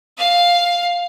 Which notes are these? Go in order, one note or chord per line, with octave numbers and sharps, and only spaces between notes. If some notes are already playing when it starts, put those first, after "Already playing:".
F5